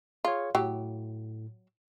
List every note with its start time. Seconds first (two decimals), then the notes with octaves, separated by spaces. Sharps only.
0.25 F4 G#4 C#5
0.55 A2 F#3 G4